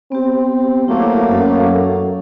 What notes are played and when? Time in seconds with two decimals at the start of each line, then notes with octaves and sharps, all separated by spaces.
0.12 B3 C4 G4
0.88 F#3 A3 A#3 E4 A#5 D6
1.31 F#2 A4 F5 F#5